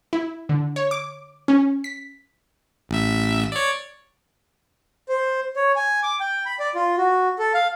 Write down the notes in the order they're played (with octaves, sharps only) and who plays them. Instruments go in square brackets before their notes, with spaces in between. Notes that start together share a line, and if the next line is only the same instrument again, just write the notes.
[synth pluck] E4
D3
C#5
D6
C#4
B6
[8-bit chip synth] A1 E5
C#5 D5
[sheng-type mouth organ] C5
C#5
G#5
D6
G5
B5
D5
F4
F#4
A4
F5